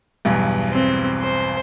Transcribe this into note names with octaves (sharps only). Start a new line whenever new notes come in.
B1 E2 G2
C4
C5